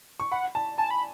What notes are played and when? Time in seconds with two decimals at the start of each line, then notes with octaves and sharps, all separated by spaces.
0.20 C#6
0.32 F#5 B5
0.55 A5
0.78 G#5 A5
0.91 B5